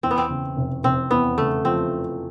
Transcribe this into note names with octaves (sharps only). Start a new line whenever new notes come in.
E2 C4
B3
C4
C#3
F1
F1 C4
E2 B3
C#3 A3
F3 C4